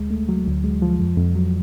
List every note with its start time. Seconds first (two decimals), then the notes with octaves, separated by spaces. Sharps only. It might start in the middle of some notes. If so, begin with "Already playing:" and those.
Already playing: D2 G#3
0.11 A3
0.29 F#3
0.47 D2
0.64 G#3
0.82 F3
1.00 F2
1.17 F2
1.36 F#3